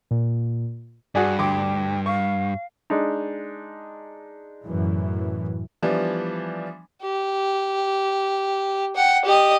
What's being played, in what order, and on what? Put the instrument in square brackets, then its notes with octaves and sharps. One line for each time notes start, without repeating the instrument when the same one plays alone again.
[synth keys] A#2
[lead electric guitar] G2 [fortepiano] F#4 G#4 D5
[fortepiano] D2 C6 D6 [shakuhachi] G5
[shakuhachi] F5 [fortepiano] C#6
[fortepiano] G#3 D4 D#4
[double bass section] F#2 A2 E3
[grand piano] E3 F3 G3 B3 D4
[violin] G4
F#5 G5
G4 D#5